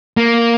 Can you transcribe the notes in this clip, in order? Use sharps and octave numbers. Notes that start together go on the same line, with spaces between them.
A#3